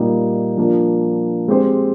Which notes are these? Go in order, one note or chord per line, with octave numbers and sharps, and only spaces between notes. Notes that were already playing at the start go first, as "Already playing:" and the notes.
Already playing: A#2 G3 A#3 D#4 G4
F3 A#3 D4
G#3 C4 G4 C5